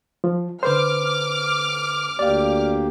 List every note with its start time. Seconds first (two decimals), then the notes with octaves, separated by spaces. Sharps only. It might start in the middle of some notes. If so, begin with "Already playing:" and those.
0.24 F3
0.63 D3 B4 C5 D6 F6
2.19 D2 A#3 G4 D5 F5